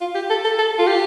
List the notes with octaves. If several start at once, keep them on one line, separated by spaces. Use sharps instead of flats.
F4
G4
A4
A4
A4
F4
G4